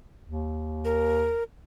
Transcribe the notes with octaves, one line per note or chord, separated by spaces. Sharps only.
D#2
A#4